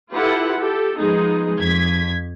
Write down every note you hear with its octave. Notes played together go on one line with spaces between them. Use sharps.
E4 F4 G4 A4 B4 F#5
G4 A4
F3 G#3 B3 D#4 G#4
F2 G#6 B6